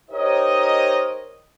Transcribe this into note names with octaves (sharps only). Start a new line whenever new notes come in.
D#4 G4 A#4 C5 C#5 D#5